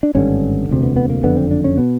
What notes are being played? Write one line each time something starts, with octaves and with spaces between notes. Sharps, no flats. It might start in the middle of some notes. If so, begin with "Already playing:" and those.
D4
G#1 G2 D3 C#4
E1 D2 C3
B3
B3
A#3
F#1 F2 D3 B3
C4
D4
C#4
B2 B3